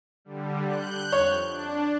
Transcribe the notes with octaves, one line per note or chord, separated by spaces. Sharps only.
D3 G3
F#6 G6
F2 C#5
D4